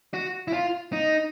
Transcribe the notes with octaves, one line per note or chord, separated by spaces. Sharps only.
F#4
E4
F4
D#4